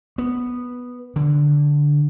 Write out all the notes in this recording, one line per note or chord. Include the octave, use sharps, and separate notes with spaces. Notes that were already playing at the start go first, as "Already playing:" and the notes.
B3
D3